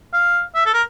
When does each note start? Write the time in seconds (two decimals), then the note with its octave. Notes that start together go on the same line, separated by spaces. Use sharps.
0.13 F5
0.55 E5
0.66 A4
0.73 A#4